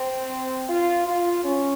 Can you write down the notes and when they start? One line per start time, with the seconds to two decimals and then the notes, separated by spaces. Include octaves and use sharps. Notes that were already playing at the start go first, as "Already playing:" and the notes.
Already playing: C4
0.69 F4
1.07 F4
1.44 C#4